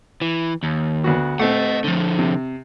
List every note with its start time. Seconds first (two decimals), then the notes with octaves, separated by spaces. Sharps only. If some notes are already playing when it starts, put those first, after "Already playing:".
0.21 E3
0.63 D#2
1.04 D2 B3 F#4
1.40 A3 C4 D#5 F#5
1.84 D3 F3
2.19 C3